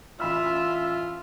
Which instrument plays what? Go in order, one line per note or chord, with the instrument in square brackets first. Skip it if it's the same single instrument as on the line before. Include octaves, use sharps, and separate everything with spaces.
[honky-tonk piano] A1 B5 F6 [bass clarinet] F4 [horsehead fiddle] E5